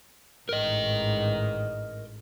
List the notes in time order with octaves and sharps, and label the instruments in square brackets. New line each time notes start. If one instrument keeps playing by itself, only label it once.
[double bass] A1 G#2 [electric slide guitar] A#4 D#5